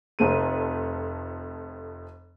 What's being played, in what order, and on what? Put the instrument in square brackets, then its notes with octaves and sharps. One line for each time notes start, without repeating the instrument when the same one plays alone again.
[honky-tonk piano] F1 F2 A3 D#7